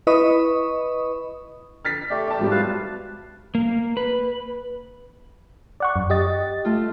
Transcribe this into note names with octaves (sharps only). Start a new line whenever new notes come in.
E4 B4 D#5 B5 C#6 D#6
F6 A6 B6
A3 G4 D5
A5 D6
G#2 F#3 G3
B4 F5 A5
A#3
B4
D5 F#5 C#6
F#2
G4 D#5 A6
A3 F4